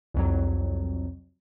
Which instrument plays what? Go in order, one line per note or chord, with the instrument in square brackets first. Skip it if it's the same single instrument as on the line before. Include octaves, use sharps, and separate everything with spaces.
[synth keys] C2 F2 F#3